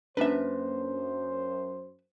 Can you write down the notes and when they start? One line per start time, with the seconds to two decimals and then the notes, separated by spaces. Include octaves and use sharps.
0.17 F#2 A#3 C#4 D4 B4 C5 E5